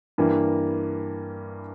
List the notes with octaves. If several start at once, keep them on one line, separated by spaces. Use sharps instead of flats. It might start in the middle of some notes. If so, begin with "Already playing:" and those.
G2 E3 A#3